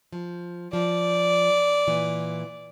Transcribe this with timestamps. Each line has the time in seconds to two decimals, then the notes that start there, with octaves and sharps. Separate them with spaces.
0.12 F3
0.73 F3 D5
1.87 A#2 E3